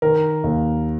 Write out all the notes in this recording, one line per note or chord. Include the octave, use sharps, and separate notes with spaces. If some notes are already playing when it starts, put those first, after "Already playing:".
D#3 A#4
D#2